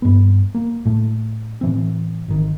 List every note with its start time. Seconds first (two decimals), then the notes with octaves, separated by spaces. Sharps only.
0.02 G2 B3
0.55 A#3
0.85 A2 A3
1.61 A2 E3 C4
2.28 G#1 D#3